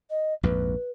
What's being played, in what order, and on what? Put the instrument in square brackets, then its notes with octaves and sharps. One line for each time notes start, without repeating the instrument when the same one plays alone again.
[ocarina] D#5
[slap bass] A#1 F2 G#2 [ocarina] B4